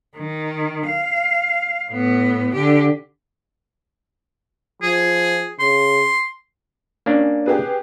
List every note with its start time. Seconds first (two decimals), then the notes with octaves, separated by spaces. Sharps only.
0.18 D#3
0.87 F5
1.91 A2 B3
2.55 D3 G4
4.82 F3 G#4
5.59 C#3 C6
7.06 A#3 C#4 D4
7.46 G4 G#4 B4